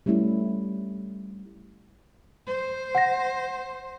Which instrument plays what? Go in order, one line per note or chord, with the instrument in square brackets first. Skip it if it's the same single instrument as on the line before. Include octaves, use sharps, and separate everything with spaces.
[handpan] G3 A3 C#4 E4
[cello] C5
[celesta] F#5 A#6